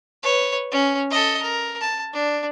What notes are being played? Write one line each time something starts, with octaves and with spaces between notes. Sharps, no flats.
B4 C#5
C#4
A4 D#5
A#4
A5
D4